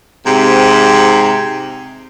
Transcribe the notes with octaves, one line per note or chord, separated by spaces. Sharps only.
G#2 C3